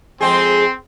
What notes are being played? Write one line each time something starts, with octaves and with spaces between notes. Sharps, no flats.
F2 G#3 C4 G#4 C6